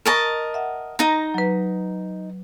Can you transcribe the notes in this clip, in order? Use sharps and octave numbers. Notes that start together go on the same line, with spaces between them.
A#4 D#5 A5 B5 C#6 A#6
E5 F#5
D#4 A#5
F#3 B4